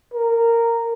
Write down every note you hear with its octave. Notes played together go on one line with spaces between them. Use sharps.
A#4